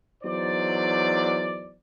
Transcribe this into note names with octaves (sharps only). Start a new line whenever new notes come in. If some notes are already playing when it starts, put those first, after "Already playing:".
E2 F#3 D#4 C5 D5